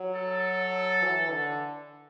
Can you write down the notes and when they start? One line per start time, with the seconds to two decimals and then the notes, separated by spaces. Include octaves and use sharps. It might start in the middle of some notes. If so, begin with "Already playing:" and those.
Already playing: F#3
0.16 A4
1.03 E3
1.31 D3